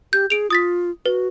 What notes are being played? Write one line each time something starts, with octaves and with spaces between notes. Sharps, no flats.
G4 G6
G#4 D7 F7
F4 D#6 A6 B6
F#4 B4